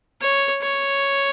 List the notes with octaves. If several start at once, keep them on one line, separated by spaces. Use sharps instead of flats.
C#5
C#5